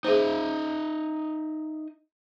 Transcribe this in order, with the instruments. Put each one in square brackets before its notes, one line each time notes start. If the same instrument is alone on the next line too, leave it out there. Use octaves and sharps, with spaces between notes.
[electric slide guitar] D#4 D#5 E5 [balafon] G#4 C5